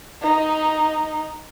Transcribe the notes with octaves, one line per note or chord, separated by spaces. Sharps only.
D#4